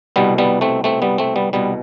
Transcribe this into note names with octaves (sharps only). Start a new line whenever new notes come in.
C2 B2 G3 B3
G3 B3
A3 C4
A3 C4
G3 B3
A3 C4
G3 B3
C2 B2 G3 B3